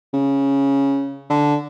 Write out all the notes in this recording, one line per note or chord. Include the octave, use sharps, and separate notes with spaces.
C#3
D3